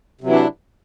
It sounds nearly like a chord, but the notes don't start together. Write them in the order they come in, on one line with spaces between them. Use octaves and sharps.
C3 F#3 E3 E4 D4